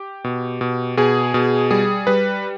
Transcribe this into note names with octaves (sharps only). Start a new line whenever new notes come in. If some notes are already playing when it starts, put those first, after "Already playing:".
Already playing: G4
B2
B2
B2 G#4
B2
G3 G#4
G3 B4